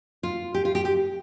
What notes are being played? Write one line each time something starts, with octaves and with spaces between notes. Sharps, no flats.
F4
G4
F4
G4
G4